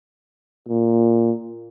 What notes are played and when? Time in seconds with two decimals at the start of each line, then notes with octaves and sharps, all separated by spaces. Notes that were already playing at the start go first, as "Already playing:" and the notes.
0.68 A#2